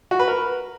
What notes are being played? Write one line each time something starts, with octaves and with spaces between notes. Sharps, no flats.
F#4
B4
A#4